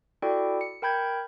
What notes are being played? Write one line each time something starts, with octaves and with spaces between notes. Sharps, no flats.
E4 F#4 A4 D5 G5
C#7
A#4 G5 B5 G6 G#6